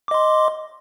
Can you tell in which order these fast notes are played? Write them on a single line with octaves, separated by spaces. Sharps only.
D6 D#5 C6